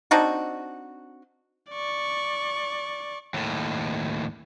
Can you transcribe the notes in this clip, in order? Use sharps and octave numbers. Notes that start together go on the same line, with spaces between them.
C4 D4 D#4 F#4
D5 C#6
D#2 A2